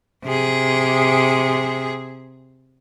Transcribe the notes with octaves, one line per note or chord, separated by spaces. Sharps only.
C3 G#4